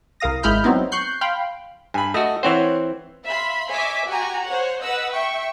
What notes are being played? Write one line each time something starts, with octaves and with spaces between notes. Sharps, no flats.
C2 A#4 F5 D#6 A#6
G#1 G#3 E4 B5 F6 G6
F#3 B3 C4 D#4 E4
C#6 F#6 G6 C7
F5 G5 B5 C6
G2 G#5 B5
A3 F#4 D#5
E3 C4 C5 C#5 F#5
E5 F5 B5 C6
C#5 D#5 E5 G#5 D6 B6
F#4 G4 G#5 A#5
C5 C#5 F#5
B4 D#5 F#5 E6
E5 G5 C#6